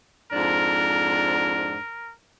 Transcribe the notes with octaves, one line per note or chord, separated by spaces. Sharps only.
F2 G#2 D4 A#4